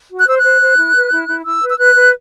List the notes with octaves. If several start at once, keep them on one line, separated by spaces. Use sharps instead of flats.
F#4
F#6
C5 E6
F#6
C5
C5
E4
B4
E4
E4
E4 E6
B4
E6
B4 F#6
B4